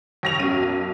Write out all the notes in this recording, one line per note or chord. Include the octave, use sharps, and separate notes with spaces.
D#2 A#6 F7
B1 F#2 D#7